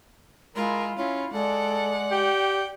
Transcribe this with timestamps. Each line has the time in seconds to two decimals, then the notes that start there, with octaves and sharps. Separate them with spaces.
0.56 G#3 E4 F4 A#4
0.97 C#4 E4 F4
1.33 G#3 A4 D5 F#5
2.12 G4 G5